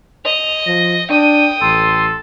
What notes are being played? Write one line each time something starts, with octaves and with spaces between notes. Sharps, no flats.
D#5 F7
F3 A#6
D4 G5 D#6 D#7
A1 A4 C6